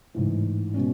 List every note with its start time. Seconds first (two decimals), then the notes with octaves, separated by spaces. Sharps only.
0.14 A1 G#2 E3
0.74 B2 G#3 C#4